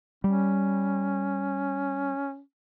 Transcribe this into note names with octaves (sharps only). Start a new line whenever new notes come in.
G3 C#4